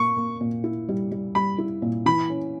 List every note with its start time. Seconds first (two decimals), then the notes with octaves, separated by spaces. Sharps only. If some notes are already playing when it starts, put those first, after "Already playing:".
Already playing: A#2 A#3 C#6
0.17 A#3
0.41 A#2
0.64 E4
0.89 G3
1.11 G3
1.35 G3 B5
1.58 E4
1.82 A#2
2.06 E3 B5
2.30 C#4